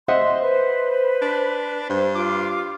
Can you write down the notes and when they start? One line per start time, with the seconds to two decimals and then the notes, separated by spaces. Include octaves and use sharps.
0.08 C5 D#5 E5 F#5 C6
0.42 B4
1.22 D4
1.90 G2 C5
2.15 F4 D6